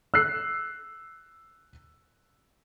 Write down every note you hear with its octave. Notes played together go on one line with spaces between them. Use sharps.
E6 F#6 C7